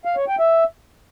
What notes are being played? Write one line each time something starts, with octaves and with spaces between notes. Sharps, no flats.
F5
C#5
G5
E5